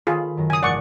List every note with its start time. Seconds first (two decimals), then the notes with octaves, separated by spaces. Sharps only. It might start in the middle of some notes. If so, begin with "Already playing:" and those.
0.07 D#3 F4 G#4 A4 B5
0.37 F#2 D#3 A#5
0.50 C#3 G#5 D#6
0.63 G#1 E3 D5 F#5 C#6